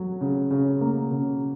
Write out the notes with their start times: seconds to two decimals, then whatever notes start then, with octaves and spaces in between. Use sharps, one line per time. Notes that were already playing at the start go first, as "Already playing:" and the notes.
Already playing: F#3
0.21 C#3
0.51 C#3
0.81 A#3
1.11 C#3